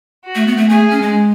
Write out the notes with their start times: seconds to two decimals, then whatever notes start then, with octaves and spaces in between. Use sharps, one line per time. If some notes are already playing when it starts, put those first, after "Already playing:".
0.25 F#4
0.35 A3
0.47 B3
0.57 A3
0.69 A3 G#4
0.91 C#4
1.02 G#3